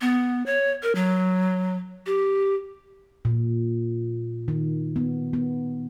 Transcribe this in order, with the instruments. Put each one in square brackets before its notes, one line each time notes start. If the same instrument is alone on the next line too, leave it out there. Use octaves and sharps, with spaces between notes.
[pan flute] B3
C#5
A#4
F#3
G4
[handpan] A#2
D#3
B3
B3